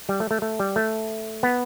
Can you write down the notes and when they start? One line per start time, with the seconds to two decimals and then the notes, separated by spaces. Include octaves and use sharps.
0.09 G3
0.20 A3
0.31 A3
0.42 A3
0.60 G3
0.76 A3
1.43 B3